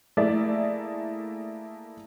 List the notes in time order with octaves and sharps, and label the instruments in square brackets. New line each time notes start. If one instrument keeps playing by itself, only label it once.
[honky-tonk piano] A3 A#3 E4 G#4 D5 E5